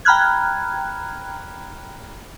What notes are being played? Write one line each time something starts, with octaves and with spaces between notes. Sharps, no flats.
G5 A#5 B5 F6 F#6 G#6